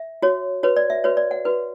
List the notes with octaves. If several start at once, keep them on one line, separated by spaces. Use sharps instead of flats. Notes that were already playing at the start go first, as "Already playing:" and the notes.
Already playing: E5
F#4 C#5
F#4 B4 C#5
D5
E5
F#4 B4 C#5
D5
F#5
F#4 B4